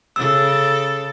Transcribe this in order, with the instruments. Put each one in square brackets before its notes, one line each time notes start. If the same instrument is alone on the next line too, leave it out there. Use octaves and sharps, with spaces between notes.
[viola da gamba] C#3 A4 [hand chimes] E6